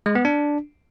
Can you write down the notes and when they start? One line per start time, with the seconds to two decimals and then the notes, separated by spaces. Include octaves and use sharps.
0.06 G#3
0.15 B3
0.25 D4